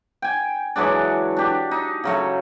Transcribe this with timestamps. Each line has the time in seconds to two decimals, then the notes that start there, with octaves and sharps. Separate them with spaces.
0.22 G5 G#5
0.76 E3 F#3 G#3 D4
1.37 D4 G4
1.71 D#4
2.04 C#3 F#3 A3